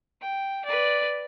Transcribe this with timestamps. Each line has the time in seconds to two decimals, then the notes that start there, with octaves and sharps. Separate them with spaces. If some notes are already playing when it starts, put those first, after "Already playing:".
0.21 G5
0.65 B4 D5